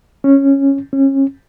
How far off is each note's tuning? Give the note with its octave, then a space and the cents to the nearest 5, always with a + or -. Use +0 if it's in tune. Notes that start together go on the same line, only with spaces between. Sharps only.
C#4 -10
C#4 -30